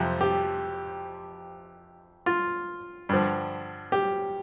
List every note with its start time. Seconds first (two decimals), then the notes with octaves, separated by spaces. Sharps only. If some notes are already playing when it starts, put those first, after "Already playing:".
Already playing: F2 C3 F3 C5
0.21 G4
2.26 F4
3.09 G2 D3 F3
3.92 G4